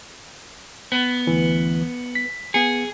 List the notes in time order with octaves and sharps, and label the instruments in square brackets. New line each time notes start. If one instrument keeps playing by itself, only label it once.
[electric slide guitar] B3
[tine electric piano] D2 E3
B6
[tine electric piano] B3 C#7 [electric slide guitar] G#4